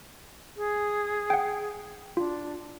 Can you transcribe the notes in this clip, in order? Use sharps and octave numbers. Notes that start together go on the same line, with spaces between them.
G#4
F#5 G5
D4 F4